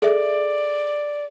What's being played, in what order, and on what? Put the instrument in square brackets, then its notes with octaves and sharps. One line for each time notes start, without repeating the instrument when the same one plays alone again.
[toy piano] G#4 A4 E5 [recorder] D5